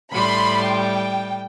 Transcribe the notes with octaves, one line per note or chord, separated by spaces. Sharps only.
A2 G3 B5 C6
G5